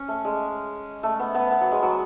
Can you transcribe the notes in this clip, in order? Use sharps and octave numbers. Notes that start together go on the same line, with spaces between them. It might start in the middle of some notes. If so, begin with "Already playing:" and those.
Already playing: C#4
A3
G#3
A3
B3
B3
B3
F#3
G#3
F#3